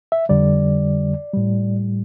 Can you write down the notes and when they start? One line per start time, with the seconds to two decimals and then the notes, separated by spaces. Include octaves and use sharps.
0.12 E5
0.29 F2 D3 G3 D5
1.33 A2 G3